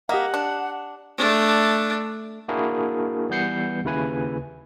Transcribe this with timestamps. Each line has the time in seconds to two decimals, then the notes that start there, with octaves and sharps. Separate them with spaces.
0.09 A#3 G4 D#5 E5 F#5
0.34 D4
1.18 A3 D4
2.48 A#3 D4 E4 F#4 G#4 A#4
3.29 E3 G3 B3 G6 C7 C#7
3.84 D#2 C#3 E4 B4 G#5